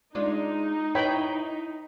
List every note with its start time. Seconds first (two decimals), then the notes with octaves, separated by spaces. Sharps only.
0.15 G#3 D4 D#4 F4
0.95 E4 B4 C#5 G5 B5